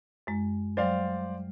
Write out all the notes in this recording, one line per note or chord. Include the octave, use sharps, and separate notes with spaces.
F#2 G#3
F#3 G3 C5 D5 F5